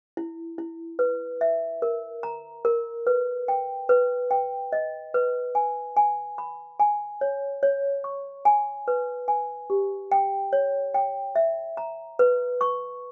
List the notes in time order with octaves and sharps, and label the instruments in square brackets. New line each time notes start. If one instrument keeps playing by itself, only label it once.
[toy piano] E4
E4
B4
E5
A#4
A#5
A#4
B4
G5
B4
G5
D#5
B4
G#5
G#5
B5
G#5
C#5
C#5
C#6
G#5
B4
G#5
G4
G5
C#5
G5
E5
A#5
B4
C#6